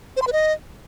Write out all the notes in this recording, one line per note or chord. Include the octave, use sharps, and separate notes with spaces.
C5
C6
B4
D#5